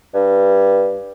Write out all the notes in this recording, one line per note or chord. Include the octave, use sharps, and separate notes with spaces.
G2